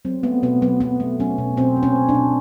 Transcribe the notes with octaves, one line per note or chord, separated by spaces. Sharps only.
F#3 C4
A3 B3
B2 B3
F#3 B3
F#3 B3
A3
F#3 C#4
B2
B2 C4
B2
C#4
B2
D4
B2